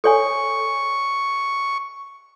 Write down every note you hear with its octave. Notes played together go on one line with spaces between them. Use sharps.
A4 C#5 G#5 C#6